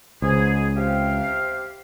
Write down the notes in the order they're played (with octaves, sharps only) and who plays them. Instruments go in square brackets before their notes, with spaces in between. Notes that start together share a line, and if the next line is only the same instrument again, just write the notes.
[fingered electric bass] C#2 [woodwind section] G#2 G#4
[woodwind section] C3 G4 F5